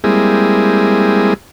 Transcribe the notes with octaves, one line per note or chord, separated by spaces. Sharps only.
G3 G#3 A#3 C4 E4 G#4